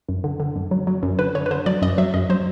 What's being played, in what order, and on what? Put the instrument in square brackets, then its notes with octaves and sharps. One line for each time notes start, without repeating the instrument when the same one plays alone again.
[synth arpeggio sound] F#2
D3
D3
F#2
F#3
F#3
F#2
D3 B4
D3 C#5
B4
D3 C5
F#3 D5
F#2 D#5
F#3 E5
F#2 D#5
F#3 C5